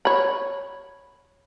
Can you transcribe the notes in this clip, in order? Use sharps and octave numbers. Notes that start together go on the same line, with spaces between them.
C#5 B5